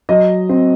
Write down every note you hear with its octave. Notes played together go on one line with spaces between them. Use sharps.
F#3 D#5
C4